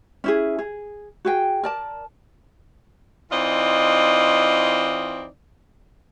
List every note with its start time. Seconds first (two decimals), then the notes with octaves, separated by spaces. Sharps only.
0.24 C#4 E4 G#4
0.59 G#4
1.25 F#4 G#4 G5
1.63 A#4 D5 A5
3.31 E3 C4 D#4 F4 D5 D#5